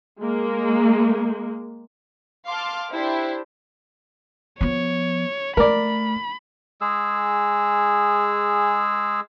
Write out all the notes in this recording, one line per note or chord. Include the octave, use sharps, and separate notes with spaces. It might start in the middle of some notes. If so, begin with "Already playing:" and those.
G#3 A#3
F5 A5 C6 D6 F6
D4 E4 G4 C5
F3 B3 C#5
A3 A#4 D5 B5
G#3 G#4 E6